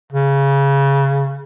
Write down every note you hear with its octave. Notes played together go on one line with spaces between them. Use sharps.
C#3